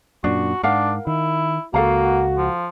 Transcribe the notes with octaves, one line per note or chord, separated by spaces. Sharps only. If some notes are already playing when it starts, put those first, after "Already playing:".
F#2 A#2 D4 F#4
G#2 D4 A#4 F5 F#5
D#3 E4
C#2 A#3 F#4 A4 F5 A#5
F3